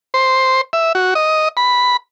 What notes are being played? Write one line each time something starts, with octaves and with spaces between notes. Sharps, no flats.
C5
E5
F#4
D#5
B5